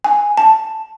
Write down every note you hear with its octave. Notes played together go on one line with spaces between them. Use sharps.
G#5
A5